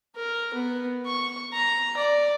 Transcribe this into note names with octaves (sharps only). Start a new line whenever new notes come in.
A#4
B3
C#6
A#5
D5